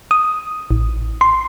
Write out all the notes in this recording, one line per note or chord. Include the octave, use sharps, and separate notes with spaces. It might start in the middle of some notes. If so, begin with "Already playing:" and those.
D#6
A1
C6